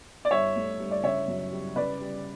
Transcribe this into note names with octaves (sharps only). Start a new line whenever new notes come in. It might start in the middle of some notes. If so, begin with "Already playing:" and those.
D5
G2 C#5 E5
A3
G2
D5
C#3 C#5 E5
F#2
G3
C#3 B4 D5
G3